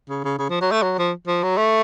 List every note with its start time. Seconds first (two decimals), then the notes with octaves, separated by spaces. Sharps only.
0.09 C#3
0.25 C#3
0.39 C#3
0.50 F3
0.62 F#3
0.72 A3
0.83 F#3
0.99 F3
1.28 F3
1.43 F#3
1.58 A3